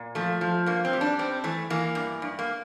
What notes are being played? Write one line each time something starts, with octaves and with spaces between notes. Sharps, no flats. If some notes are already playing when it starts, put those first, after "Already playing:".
Already playing: A#2
F3 A3
F3
G2 A#3
C4
G3
D4
G2 C4
E3 A3
E3 A#3
G2
G2
A#3